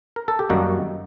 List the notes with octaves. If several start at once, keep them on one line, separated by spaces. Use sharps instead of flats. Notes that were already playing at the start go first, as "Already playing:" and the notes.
A#4
A4
G4
F#2 D#3 G3 A#3 D#4 F#4